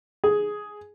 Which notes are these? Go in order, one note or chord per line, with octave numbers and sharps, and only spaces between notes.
G#4